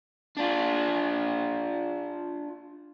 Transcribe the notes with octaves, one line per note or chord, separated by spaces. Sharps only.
D4 F4